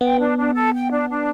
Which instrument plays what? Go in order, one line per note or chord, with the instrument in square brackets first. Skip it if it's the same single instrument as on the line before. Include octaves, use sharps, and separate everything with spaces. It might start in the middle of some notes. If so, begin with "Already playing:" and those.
[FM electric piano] B3 [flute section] G5
[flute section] D4
D4
A4
G5
D4
D4